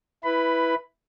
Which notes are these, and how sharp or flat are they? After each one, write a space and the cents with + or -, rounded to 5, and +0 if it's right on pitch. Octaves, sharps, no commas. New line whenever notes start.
E4 +0 B4 +0 B5 +15